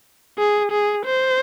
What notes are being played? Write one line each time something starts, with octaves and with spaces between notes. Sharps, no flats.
G#4
G#4
C5